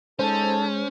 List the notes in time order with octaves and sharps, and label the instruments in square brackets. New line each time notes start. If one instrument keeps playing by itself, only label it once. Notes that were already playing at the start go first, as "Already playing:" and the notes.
[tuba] G#3 [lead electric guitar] C#4 [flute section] D#4 A4 A5 [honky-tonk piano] C5